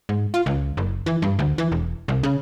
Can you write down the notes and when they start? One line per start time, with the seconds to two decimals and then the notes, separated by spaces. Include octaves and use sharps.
0.09 G#2
0.34 F4
0.46 C#2
0.77 F#1
1.06 E3
1.22 G2
1.39 D2
1.58 E3
1.72 E1
2.08 C2
2.23 C#3